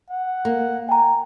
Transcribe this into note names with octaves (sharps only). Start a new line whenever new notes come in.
F#5
A#3
G5 G#5 A#5